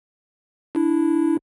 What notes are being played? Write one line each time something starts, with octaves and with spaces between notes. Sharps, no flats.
D4 E4